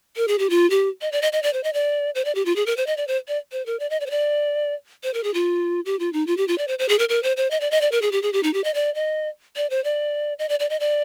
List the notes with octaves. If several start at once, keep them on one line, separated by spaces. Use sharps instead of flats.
A#4
G#4
G4
F4
G4
D#5
D5
D#5
D#5
D5
C5
D#5
D5
C5
D5
G4
F4
G#4
A#4
C5
D#5
D5
C5
D5
C5
A#4
D5
D#5
D5
C5
D5
C5
A#4
G#4
F4
G4
F4
D#4
F4
G4
F4
D5
C5
C5
G#4
A#4
A#4
C5
C5
D#5
D5
D#5
D5
A#4
G#4
G4
G#4
G4
D#4
G4
D#5
D5
D#5
D5
C5
D5
D#5
D5
D5
D#5
D5